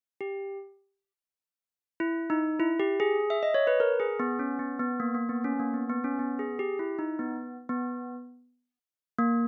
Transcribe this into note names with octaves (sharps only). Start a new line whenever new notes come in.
G4
E4
D#4
E4
G4
G#4
E5
D#5
C#5
B4
A#4
G#4
B3
C#4
B3
B3
A#3
A#3
B3
C#4
A#3
B3
B3
C#4
B3
G#4
G4
E4
D#4
B3
B3
A#3